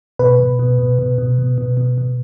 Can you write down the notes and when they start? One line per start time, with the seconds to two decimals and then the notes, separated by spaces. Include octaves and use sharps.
0.19 B2 B4
0.40 B2
0.59 B2
0.79 B2
0.99 B2
1.18 B2
1.39 B2
1.58 B2
1.77 B2
1.98 B2